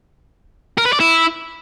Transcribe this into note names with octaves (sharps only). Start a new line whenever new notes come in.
A#4
B4
D5
E4